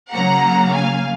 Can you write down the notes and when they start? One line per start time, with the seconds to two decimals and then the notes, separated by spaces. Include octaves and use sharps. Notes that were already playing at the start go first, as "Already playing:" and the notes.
0.12 C#3 F#3 A#3 F#5 A#5
0.74 F5 G#5